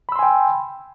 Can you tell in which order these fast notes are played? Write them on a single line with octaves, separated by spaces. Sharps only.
B5 E6 C6 G#5 G5